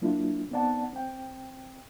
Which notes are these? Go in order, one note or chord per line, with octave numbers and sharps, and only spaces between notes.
F#3 A#3 D4 E4 F4
B3 C4 D#4 D5 F#5 A5
C4 G5